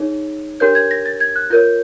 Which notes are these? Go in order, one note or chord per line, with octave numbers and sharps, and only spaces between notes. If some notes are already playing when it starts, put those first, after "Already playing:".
Already playing: D#4 G#4 C#5
D4 G4 A#4 C#5 G6
G#6
A#6
A6
G#6
F#6
F4 A#4 C#5 G6